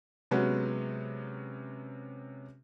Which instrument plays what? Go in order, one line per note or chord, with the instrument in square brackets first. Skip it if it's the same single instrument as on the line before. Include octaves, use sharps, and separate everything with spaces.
[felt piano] C3 F#3 G#3 B3 C#4